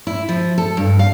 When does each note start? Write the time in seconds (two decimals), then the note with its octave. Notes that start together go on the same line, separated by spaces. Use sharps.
0.07 E4
0.29 F3
0.58 A4
0.77 G2
0.99 F5